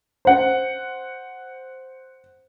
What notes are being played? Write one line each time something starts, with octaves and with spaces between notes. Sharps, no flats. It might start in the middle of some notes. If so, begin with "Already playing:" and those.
C5 F#5